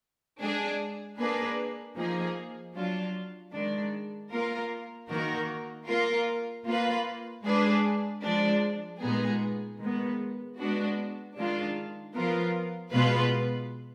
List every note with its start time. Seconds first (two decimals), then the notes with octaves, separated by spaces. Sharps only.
0.40 G#3 D4 G#4
1.18 A#3 D4 G#4 B4
1.97 F3 A#3 D#4 G#4
2.75 F#3 D4 F4
3.54 D#3 G#3 D4
4.31 A#3 F4 A#4
5.09 D#3 A#3 D#4 F#4 A#4
5.88 A#3 F4 A#4
6.66 A#3 F4 B4
7.44 G#3 D4 G#4 B4
8.23 F3 G#3 D4
9.01 A#2 G#3 B3 D#4 G#4
9.80 D#3 G#3 B3
10.58 G#3 B3 D4 F#4
11.37 D#3 G#3 D4 F4
12.15 F3 B3 F4 A#4
12.92 B2 G#3 B3 F4 B4